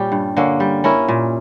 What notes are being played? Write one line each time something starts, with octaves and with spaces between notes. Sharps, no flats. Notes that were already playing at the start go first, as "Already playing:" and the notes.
Already playing: A#2 G3 C#4 G4
G2
D3 A#3 C#4
G3
C#4 E4 A#4
A#2